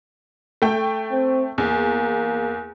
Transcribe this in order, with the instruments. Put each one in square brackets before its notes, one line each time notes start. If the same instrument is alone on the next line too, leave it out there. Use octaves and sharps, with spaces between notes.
[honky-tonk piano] A3 G5
[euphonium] C4
[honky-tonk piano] E2 [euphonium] A#3